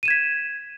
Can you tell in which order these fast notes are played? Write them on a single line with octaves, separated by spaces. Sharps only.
D#7 E7 G#6 B6